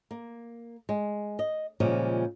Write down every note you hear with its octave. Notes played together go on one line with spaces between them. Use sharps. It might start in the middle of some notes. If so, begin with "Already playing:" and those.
A#3
G#3
D#5
A#2 C#3 F3 G3 G#3